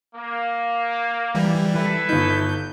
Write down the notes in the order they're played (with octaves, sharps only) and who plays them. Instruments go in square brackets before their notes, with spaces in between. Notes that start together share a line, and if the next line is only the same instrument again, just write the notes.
[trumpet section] A#3
[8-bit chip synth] E3 G3
[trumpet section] E4 A4 B4
[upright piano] G1 D#4 [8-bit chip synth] G6